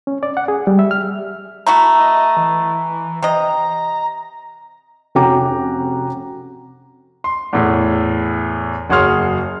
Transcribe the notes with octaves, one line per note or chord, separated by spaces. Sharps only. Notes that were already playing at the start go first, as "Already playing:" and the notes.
C#4
D5
F#5
G#4
G3
E5
F6
A3 E4 F#4 A#5
D#5
E3
C3 D#5 A#5
F1 C#4 F#4 G5 A#5 D6
C6
E2 A2
F#1 F#4 G#4 C#5 C6 F6